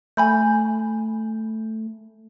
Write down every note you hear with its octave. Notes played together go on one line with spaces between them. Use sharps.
A3 G#5 B5 G6